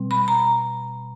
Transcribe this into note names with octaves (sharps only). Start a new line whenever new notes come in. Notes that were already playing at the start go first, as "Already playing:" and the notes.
Already playing: B2 G3 C4
B5
A#5